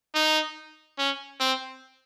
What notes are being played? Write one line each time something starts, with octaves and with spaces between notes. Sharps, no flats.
D#4
C#4
C4